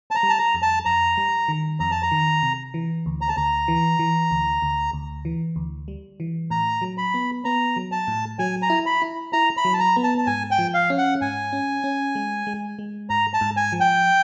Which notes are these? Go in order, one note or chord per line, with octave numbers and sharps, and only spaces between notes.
A5
A#5
G3
A5
A#5
F2
A5
F2 A#5
G3
D#3
F2 A#5
A5
A#5
D#3
C3
E3
D2
A#5
A5
D2 A#5
E3
E3
D2
D2
D2
E3
D2
G3
E3
A2 A#5
F#3
B5
B3
B3 A#5
F#3
A5
A2
F#3 G#5
A#5
E4
B5
E4
E4 A#5
B5
F#3
A5
A#5
B3
A5
A5
G#2 G#5
G5
F3
F5
C#4
F#5
G#2 G#5
C#4
C#4
G#3
G#3
G#3
G#2 A#5
A5
G#2
G#5
F3
G5